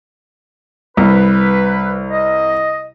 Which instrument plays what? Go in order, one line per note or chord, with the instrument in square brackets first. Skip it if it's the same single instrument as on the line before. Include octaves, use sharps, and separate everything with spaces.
[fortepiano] C2 [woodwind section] B4
[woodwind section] D#5